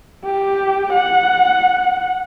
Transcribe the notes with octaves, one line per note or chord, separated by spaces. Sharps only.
G4
F#5